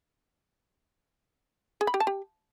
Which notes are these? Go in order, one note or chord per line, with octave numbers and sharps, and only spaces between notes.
G#4
B5
G4
A5
G4